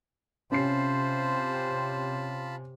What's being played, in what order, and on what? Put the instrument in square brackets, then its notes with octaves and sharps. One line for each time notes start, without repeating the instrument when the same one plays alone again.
[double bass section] C3 [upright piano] C#4 C7 [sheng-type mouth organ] F4 A5 B5 [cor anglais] C5